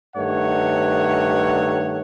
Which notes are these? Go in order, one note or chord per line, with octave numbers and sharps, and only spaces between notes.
G2 D#3 A3 C#5 F#5